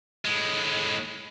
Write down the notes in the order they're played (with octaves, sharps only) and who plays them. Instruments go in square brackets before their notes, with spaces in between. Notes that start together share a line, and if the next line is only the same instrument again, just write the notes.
[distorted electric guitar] A2 G#3